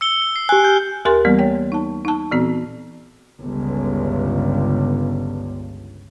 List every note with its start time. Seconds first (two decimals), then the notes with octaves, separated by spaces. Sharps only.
0.01 E6 C#7 G7
0.22 C#7
0.36 C7
0.49 G4 G#5 F#6
0.64 F6 G6
1.05 D#2 G4 A#4 G#5 C6 A6
1.25 E3 G3 A#3 B3
1.39 C#5 G5
1.72 D#4 A5
2.05 D#4 A5
2.32 A#2 E3 B3 C4 F#4
3.39 G1 C#2